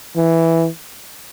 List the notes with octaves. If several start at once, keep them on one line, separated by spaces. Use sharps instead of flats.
E3